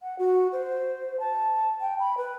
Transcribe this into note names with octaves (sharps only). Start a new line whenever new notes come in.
F#5
F#4
C5
A5
G5
B5
B4